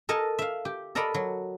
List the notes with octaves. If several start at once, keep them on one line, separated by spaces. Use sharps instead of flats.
A4 A#4 D#5 G#5 A5
E5 F5
G4
A4 A#4 D5 D#5 A#5 B5
F#3